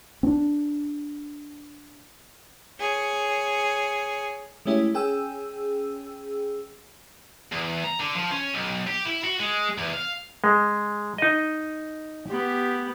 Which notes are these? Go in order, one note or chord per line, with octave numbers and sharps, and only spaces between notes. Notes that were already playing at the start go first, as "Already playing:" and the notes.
C4 D4
G#4 C#5
G#3 A3 C#4 E4 G4
C#4 G#4 G5 E6
E2
A#5
D3
F3
C#4
B1
G4
E4
F#4
G#3
E2
F5
G#3
D#4 D#5
B3 G4